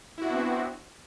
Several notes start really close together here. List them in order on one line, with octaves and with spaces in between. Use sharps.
E4 F#4 D4 B3 C4